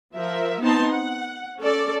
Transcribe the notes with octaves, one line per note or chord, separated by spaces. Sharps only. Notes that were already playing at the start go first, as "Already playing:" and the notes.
F3 A#4 E5
B3 C4 D#4 A5 C6
F#5
C#4 A4 D5